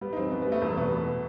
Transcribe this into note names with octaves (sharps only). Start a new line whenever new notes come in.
G3 B3
D#4
F#2 C4
F#2 B3
B3
G3 A3
E2 A3
B2 B3
B2 B3